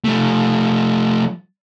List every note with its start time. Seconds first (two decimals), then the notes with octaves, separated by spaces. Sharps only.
0.04 F3 A3